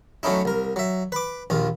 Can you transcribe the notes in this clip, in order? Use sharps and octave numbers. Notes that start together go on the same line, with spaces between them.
F#3 A3 C#4 D#4 E4
C2 A#4
F#3 E5
B4 D6
A#1 D#2 F4